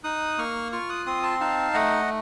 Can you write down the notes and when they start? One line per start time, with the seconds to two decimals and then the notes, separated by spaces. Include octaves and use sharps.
0.04 D#4 D#6 F#6
0.38 A#3 C#6 F6
0.72 F4 C#6 F6
0.89 D#6 F#6
1.06 C4 C6 D#6
1.23 A5 C6
1.40 D#4 F5 A5
1.74 A3 D#5 F#5